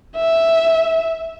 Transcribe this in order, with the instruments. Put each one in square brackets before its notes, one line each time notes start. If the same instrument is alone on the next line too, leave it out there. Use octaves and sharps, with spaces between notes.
[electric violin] E5